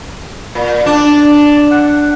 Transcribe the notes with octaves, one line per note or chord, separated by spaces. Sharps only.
A#2
D4 D5 A5
F#5